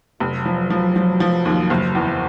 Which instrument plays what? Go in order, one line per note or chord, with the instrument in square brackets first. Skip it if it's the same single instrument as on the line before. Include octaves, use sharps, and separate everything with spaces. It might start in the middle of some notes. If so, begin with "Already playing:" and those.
[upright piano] F1 [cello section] F#3
[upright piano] F3
F3
F3
F3
D#2
F#1
E2